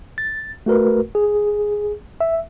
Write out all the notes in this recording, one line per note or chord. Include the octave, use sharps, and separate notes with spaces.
A6
A3 F#4 A#4 B4
G#4
E5